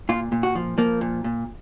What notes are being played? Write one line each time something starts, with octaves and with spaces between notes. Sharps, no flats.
A#2 F4
A#2
F#4
F3
F3 A#3
A#2
A#2